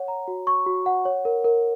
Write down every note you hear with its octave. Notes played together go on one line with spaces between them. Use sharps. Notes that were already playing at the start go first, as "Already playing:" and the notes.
Already playing: C#5 F#5
A#5
F#4
C#6
F#4
F#5
C#5
A#4
A#4